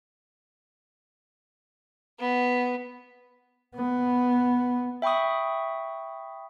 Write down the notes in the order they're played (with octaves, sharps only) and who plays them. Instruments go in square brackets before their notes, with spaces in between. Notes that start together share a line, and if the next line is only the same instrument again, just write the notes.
[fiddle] B3
[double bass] B3
[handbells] E5 G5 B5 C#6 D#6